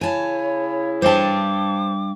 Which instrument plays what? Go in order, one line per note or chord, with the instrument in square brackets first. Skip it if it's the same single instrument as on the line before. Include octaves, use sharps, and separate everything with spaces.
[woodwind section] C#3 E4 [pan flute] C#5 [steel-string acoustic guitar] G#5 A5
[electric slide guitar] G3 D4 G5 [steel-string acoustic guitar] C5 A5 [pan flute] D6